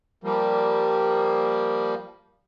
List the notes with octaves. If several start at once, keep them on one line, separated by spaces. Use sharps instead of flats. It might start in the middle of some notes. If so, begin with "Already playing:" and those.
F3 G3 A#3